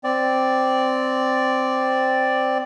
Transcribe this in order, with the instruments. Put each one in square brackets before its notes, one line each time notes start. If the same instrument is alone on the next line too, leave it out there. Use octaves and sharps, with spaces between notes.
[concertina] C4 D5